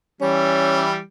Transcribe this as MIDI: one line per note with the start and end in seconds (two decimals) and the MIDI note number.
0.21 1.00 52
0.21 1.00 55
0.21 0.84 61